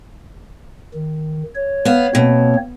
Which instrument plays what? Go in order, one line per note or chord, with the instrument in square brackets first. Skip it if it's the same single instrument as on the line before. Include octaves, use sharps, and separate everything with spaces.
[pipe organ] D#3
C#5
[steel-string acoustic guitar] B3 F5
[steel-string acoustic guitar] B2 [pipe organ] A#3 C4 C#5